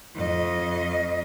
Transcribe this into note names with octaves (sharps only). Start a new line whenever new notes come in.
F2 D#5